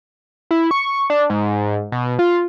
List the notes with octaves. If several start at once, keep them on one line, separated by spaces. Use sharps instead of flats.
E4
C#6
D4
G#2
B2
F4